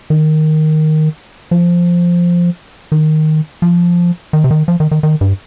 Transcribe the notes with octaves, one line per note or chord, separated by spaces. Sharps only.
D#3
F3
D#3
F3
D#3
C3
D#3
F3
D#3
D#3
D#3
G2